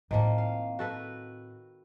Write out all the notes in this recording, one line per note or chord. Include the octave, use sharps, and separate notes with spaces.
A2 D#3 F3 A#3 C4
F5
F#4 A4 B4